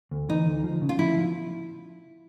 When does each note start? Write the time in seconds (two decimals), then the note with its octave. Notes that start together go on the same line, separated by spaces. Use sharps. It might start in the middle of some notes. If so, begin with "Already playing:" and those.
0.11 D2
0.29 E3 D#4
0.46 D2
0.64 F3
0.81 C#3
0.89 F4
0.99 F3 E4
1.17 F3